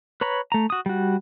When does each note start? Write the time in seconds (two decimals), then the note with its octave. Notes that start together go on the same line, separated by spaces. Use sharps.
0.21 B4 C#5 A#5 B5
0.52 A3 A#5
0.70 F#4 D#6
0.86 G3 F#4